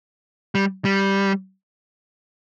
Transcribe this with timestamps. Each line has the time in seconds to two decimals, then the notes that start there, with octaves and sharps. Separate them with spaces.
0.55 G3
0.85 G3